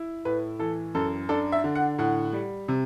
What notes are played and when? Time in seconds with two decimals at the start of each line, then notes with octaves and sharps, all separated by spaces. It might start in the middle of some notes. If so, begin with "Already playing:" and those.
Already playing: E4
0.25 A2 B4
0.59 E3 A4
0.95 F#2 A4
1.29 D4 A4
1.52 E5
1.64 D3
1.75 F#5
1.98 A2 F#5
2.33 G3
2.68 C3